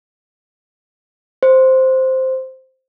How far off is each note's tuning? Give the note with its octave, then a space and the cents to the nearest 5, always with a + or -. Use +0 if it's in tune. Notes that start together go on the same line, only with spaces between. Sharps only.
C5 +0